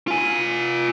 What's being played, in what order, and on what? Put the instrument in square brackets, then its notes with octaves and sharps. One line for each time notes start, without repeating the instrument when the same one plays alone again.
[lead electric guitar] F4 G#5